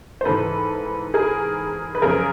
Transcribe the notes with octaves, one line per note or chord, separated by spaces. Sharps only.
C5
G#2 E3 A4 B4
G#4 A#4
B4
F#2 C#3 F3 G#4 A#4